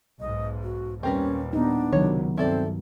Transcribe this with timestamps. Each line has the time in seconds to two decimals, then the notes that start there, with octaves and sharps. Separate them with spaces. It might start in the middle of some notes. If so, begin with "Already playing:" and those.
0.20 B1 G#2 D#5
0.63 F#4
1.03 D#2 A#2 G3 C4 C#4 A#4 B4
1.53 B3 D4 D#4
1.93 C#2 C3 D#3 F#3 C#5
2.38 G2 C4 E4 A4 D5